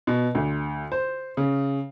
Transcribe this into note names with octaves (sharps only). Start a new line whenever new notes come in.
B2
D2
C5
C#3